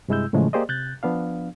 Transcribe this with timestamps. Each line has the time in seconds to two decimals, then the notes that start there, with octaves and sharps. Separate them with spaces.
0.08 G2 C3 G#3 E4 E6 G6
0.33 A2 C#3 E3 F3 G#3 A3
0.53 A#3 G4 G#4 C5 D5 D#5
0.69 C3 F#6 G6 A6
1.03 F3 B3 D4 F5